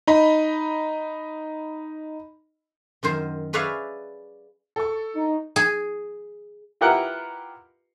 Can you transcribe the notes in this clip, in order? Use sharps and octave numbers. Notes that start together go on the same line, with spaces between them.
D#4 D#5 B5
F#2 D#3 C5
G#4 B4 C#5 D5 E5 F5
A4 C#6
D#4
G#4
E4 F4 G4 A#4 B4 F#5